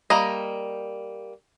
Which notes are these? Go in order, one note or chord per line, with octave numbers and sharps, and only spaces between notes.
G3 A#3 D#5